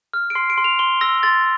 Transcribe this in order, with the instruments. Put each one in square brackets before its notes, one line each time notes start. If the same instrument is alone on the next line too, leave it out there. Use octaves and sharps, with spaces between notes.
[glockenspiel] F6
D7
C6 C7
D7
C6
F7
C6 G7
E6 A#6
C6 A6